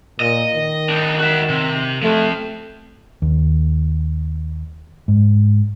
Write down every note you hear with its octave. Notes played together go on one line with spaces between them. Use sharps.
A#2 D#5
D#3
D4 D#4
F#4 E5
C3
F3 A3 C4
D#2
G#2